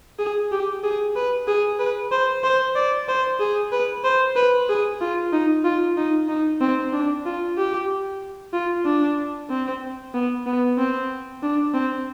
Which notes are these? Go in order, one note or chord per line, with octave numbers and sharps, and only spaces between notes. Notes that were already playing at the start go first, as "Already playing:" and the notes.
G#4
G4
G#4
B4
G#4
B4
C5
C5
D5
C5
G#4
B4
C5
B4
G#4
F4
D#4
F4
D#4
D#4
C4
D4
F4
G4
F4
D4
C4
B3
B3
C4
D4
C4